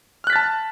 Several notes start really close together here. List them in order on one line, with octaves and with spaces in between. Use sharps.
F6 F#6 B6 A6 A5